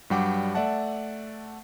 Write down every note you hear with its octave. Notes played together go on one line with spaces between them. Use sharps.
G2 F#3 G3 F#5 G5 D6
A3 D5 E5 F#5 A5